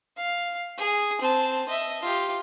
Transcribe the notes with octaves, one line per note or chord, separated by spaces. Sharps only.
F5
G#4
C4 A5
D#5 E5
F4 G4